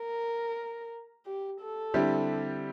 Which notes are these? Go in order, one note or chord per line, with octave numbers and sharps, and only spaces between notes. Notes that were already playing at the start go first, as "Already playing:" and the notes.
Already playing: A#4
G4
A4
D3 G3 C4 E4 G4